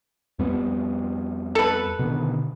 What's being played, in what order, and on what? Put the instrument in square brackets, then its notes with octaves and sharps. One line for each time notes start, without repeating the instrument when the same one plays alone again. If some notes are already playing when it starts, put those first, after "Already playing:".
[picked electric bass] F2 G3 B3
[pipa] A4 B4
[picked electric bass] B2 D3 D#3